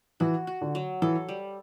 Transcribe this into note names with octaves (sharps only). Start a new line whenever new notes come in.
E3 F#4
F#4
D3
F#3
E3 A4
G3